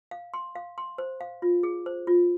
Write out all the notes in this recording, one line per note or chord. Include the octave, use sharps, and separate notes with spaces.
F5
C6
F5
C6
C5
F5
F4
G#4
C5
F4